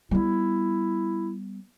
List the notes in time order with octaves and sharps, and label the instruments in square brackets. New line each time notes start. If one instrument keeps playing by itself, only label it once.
[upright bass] G3 B3 [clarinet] E4